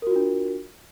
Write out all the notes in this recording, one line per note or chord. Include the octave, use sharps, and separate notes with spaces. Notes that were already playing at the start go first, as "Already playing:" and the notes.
D4 F4 F#4 A#4